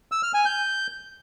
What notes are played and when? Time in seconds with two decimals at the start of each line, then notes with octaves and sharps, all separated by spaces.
0.12 E6
0.23 F6
0.34 G#5
0.45 G6